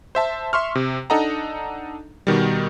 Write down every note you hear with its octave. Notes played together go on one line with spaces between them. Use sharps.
C5 E5 A5
E5 C6 C#6 F6
C3
D4 D#4 A4 D#5 F#5 A#5
B2 D#3 G3